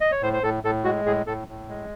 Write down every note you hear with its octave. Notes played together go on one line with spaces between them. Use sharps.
D#5
C#5
A2 C5
C5
A2 A4
A2 A4
G#3 F#4
A2 G#4
A2 A4
A2
G#3